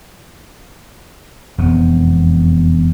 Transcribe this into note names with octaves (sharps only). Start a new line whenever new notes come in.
E1 F2 F3 B3